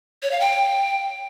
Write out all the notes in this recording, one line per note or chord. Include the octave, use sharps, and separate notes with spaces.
C#5
F5
G5